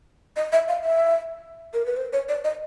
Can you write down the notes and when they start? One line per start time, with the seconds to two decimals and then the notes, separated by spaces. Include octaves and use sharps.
0.36 D#5
0.52 E5
0.68 F5
0.84 E5
1.74 A#4
1.86 B4
1.97 C5
2.13 C#5
2.29 D5
2.44 D#5